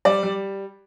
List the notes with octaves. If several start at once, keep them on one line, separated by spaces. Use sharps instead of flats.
G3 D5
G3